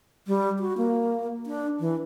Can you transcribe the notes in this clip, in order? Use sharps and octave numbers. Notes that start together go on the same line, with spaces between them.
G3
F#4
A#3
D4
E3